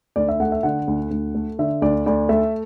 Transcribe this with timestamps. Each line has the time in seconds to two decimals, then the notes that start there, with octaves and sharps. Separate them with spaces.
0.16 D2 D5
0.29 E5
0.40 A3 F#5
0.52 E5
0.63 D3 F#5
0.88 D2
1.11 D2
1.35 A3
1.59 D3 E5
1.82 D2 D5
2.06 D2 D5
2.29 A3 E5